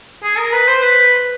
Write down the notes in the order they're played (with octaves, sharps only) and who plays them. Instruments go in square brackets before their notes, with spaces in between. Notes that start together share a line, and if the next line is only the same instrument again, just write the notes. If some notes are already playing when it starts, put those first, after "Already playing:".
[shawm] G#4
A#4
B4
C5
B4